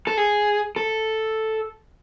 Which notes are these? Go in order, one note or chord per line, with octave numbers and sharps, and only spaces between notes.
A4
G#4
A4